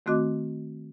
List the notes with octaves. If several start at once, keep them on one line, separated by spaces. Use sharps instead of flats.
D#3 A3 C4 F#4 D#5 D6